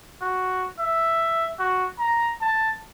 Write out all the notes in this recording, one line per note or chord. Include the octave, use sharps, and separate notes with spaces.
F#4
E5
F#4
A#5
A5